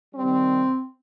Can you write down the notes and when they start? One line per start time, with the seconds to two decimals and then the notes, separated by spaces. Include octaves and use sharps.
0.15 C3 D#3 G3 C4